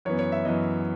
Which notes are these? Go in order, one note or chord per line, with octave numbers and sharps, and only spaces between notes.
F#2 E3 B3 C#5
C#5
E5
F#2 E3 B3 D#5